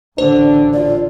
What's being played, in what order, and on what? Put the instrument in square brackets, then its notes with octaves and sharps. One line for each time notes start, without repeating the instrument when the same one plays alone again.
[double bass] A1 D3 [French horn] D4 [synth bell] C5
[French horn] F4 [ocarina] D5